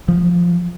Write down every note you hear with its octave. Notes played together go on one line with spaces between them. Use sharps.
F3